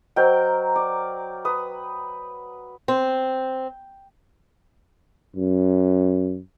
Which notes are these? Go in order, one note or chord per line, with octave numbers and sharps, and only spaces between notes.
F#3 A#4 C5 D#5 G5
D5
B4 D#6
C4
F#2